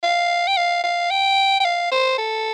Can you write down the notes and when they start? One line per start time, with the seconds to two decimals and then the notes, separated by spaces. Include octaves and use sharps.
0.03 F5
0.48 G5
0.57 F5
0.84 F5
1.11 G5
1.60 G5
1.65 F5
1.92 C5
2.18 A4